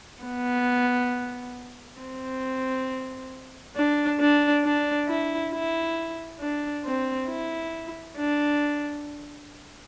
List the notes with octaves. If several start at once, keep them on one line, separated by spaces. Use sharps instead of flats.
B3
C4
D4
D4
D4
E4
E4
D4
C4
E4
D4